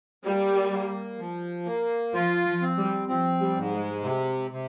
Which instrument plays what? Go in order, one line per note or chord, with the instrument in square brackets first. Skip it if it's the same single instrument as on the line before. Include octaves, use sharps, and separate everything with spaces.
[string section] G3 [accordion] A#3
[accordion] A#3
F3
A#3
[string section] F3 [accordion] F4
[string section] F3
[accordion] C4
[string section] G3
[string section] F3 [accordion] C4
[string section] G3
[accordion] G#2
[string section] G#3
[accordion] C3
C3